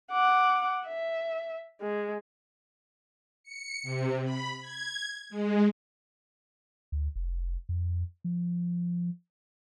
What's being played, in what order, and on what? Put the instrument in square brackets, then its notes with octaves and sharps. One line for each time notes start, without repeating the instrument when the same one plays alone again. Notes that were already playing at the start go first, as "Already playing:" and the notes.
[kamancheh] F#5 D6
E5
G#3
[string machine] C#7
C3
B5
G#6
G#3
[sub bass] D2
F1
F2
F3